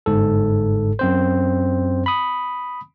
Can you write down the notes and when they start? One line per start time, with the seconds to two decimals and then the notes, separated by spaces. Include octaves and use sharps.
0.06 G1 G#2 A4
0.99 F#2 C4 C5
2.06 B5 D#6